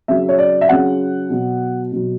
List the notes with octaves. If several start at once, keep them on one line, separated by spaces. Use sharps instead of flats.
C#3 F#3 E5
C#5
D5
E5
C#3 F#3 F#5
B2 F#3
B2 F#3